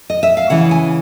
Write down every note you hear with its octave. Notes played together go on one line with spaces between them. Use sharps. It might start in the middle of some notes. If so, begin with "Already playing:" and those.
D#5
E5
F5
C#3 E3 G#3 F#5
G#5